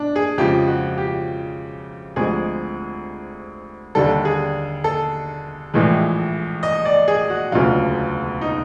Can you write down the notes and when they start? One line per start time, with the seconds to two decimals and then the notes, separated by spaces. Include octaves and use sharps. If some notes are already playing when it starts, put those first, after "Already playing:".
Already playing: D4
0.16 G#4
0.38 F2 C#3 F3 G#3 G4
0.67 F#4
0.98 G4
2.16 D2 C3 F3 G#3 G#4
3.95 D#2 D3 G3 A4
4.25 G#4
4.84 A4
5.74 A#1 A2 E3 G#3
6.63 D#5
6.85 D5
7.08 G#4
7.30 F#4
7.52 E1 D2 C#3 F#3 F4
8.41 D#4